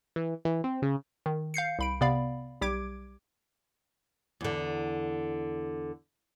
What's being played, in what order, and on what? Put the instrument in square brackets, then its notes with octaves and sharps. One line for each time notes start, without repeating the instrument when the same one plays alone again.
[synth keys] E3
E3
C4
C#3
[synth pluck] D#3
F5 G6 C7 C#7
C2 B5 D7
C3 B3 D5 F5 B5
B1 G3 G4 D6 G#6 D7
[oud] E2 D3